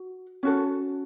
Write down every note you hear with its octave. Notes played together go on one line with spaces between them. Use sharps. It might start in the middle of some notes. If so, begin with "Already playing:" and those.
Already playing: F#4
C#4 F#4 A4